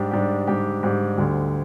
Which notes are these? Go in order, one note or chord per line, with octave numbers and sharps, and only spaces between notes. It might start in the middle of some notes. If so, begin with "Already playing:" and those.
Already playing: G#2 G3 D4 G4
G#2 G3 D4 G4
G#2 G3 D4 G4
G#2 G3 D4 G4
D2 D3 G3